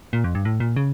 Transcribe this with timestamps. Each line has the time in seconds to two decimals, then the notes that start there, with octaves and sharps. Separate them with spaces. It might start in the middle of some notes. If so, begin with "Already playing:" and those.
0.13 A#2
0.24 F2
0.35 G2
0.45 A2
0.60 A#2
0.76 C#3